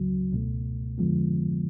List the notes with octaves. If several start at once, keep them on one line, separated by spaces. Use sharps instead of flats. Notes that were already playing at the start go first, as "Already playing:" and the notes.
Already playing: C#2 C#3 F#3
C#2 B2 A3
F2 D3 F3 G#3 B3